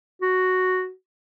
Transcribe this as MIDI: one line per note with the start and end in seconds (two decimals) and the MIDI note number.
0.22 0.90 66